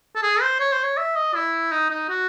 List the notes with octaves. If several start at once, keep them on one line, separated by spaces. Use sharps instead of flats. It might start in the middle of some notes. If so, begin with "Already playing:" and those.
A4
G#4
C5
C#5
C5
C#5
E5
D#5
E4
D#4
D#4
F#4